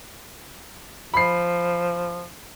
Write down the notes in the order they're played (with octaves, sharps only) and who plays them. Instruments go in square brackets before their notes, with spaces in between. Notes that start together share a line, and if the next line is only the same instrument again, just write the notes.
[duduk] F3 [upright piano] B5 C7